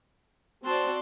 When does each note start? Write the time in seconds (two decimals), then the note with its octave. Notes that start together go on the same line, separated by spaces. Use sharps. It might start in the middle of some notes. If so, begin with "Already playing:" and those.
0.65 C4 F#4 D5 A5 C6